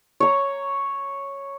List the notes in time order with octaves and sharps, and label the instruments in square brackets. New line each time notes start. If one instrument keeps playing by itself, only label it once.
[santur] C#5 A#5